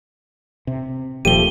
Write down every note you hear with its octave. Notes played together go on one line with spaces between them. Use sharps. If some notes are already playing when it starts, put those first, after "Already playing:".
C3
D#1 A#2 F3 A3 G4 D#7 G7